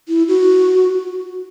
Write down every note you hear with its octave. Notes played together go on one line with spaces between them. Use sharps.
E4
F#4